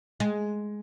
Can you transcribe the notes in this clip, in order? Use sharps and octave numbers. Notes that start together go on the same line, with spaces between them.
G#3